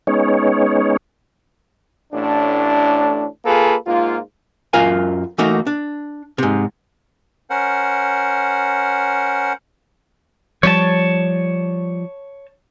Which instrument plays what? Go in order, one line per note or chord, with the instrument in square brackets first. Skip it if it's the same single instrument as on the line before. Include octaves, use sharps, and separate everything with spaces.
[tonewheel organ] G#3 B3 C#4 D#4 C#5
[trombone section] A1 A2 D4
A#3 F4 G#4 A4 B4
G#2 A#3 F4
[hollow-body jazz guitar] F#2 F#3 F4 A#4 F5 G#5
E3 A3 A#3 D#4 F#4
D4
G#2 C3
[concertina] C#4 A#4 C5 F#5
[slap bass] F3 G3 [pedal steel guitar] C#5 A5